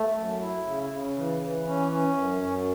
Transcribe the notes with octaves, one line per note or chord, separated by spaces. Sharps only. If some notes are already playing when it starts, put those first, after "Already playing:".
Already playing: A3
F#2
E4
C#3
C#3
E3
E3
C#4
C#4
F#2
F#2